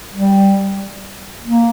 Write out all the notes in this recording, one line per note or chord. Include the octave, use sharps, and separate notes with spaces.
G3
A#3